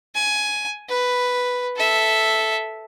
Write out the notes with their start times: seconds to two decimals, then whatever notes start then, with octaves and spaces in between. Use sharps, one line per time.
0.15 G#5
0.89 B4
1.77 A4 E5